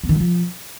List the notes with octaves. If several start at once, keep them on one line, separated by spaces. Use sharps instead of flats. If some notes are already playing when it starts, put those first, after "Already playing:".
B3
D#3
F#3
F3